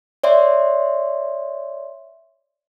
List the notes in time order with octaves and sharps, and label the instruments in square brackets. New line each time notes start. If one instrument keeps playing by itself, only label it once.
[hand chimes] C#5 D5 E5 C6